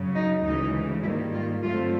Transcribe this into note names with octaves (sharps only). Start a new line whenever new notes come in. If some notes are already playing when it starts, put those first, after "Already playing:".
Already playing: F#2 C#3 F#3
D#4
D2 C#3 E3 G#3 D#4
G#2 D#3 G3 A#3 E4
F4
G2 D3 F#3 A3 C4 F4